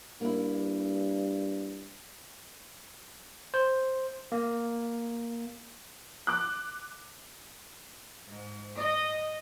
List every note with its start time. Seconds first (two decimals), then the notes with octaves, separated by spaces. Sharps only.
0.21 G2 A#3 E4
3.54 C5
4.32 A#3
6.27 D6 F#6
8.28 G#2
8.78 D#5